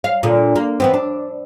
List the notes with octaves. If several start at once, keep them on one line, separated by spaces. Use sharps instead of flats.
F5
A#2 D3
A#3
E3 B3 C4
D4